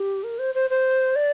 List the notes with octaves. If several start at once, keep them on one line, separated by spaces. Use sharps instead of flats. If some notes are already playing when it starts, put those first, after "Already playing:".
Already playing: G4
A#4
C5
C5
C5
D5